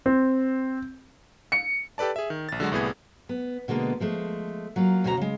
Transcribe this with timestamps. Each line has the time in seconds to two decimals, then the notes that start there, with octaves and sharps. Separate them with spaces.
0.06 C4
1.52 C#7
1.98 G4 A4 B4 D5 A5
2.16 G#4 E5
2.30 D#3
2.49 A#1 A6
2.60 D3 F#3 G#3 F#4
2.72 C2 A2 B3 G#4 G#6
3.29 B3
3.68 B2 D3 G#3 A#3 B3
4.00 F3 G#3 A3
4.76 F#3 A#3 F4
5.04 D2 B2 C#4 F#4 A#4 A#5
5.17 C#3 G#3